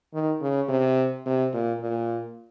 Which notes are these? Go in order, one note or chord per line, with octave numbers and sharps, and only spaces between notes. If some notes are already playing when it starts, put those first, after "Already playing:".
D#3
C#3
C3
C3
A#2
A#2